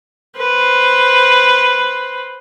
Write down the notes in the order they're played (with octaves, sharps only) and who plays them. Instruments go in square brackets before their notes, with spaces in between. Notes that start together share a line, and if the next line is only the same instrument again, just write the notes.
[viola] B4 C5